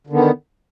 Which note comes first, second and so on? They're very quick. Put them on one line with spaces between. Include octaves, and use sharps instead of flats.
D3 D#3 B3